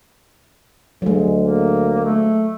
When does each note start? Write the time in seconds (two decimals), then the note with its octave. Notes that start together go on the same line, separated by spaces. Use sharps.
1.02 D2 F#3 G#3
1.42 A#3
2.05 A3